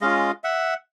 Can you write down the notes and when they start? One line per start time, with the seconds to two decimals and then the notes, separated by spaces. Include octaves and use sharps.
0.01 G#3 C#4 F4 D#5 F5
0.44 E5 F#5